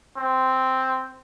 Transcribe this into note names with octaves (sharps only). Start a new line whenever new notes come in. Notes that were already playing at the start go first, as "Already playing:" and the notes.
C4